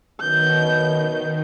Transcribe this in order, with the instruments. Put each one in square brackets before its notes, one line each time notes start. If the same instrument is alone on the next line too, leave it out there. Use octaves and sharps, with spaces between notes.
[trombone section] F#2 B2 [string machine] D#3 [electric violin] G6